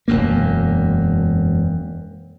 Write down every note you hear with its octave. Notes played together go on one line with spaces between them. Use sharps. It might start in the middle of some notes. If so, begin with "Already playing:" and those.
E1 F#2 A#3